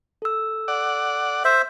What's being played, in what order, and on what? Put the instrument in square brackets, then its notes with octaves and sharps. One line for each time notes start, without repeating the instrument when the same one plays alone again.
[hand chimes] A4 E6
[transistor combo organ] D5 F#5
[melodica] C5 E5